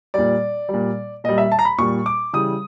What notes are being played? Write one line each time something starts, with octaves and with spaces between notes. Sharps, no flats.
A#2 G3 D5
G3
A#2
A#2 G3 D#5
E5
A5
A#5
B5
A#2 G3 C#6
D6
C#3 E3 G3 D#6